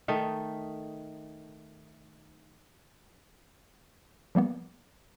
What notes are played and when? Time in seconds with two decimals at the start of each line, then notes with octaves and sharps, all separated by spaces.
0.08 D#3 A3 D#4
4.35 F3 G3 A#3 B3